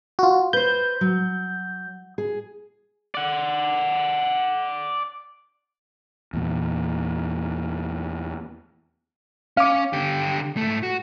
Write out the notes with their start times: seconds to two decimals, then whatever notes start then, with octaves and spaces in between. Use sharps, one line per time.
0.19 F4 F#4
0.53 B4 C5 G6
1.01 F#3
2.18 G#4
3.15 D5 F#5
6.33 E2 A#2
9.57 C#4 F5 D6
9.93 D3 G4
10.57 G#2 A3
10.83 F#4